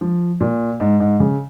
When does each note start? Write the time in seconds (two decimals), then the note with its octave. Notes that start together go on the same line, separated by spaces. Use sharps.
0.01 F3
0.41 A#2
0.80 G#2
1.00 G#2
1.20 C#3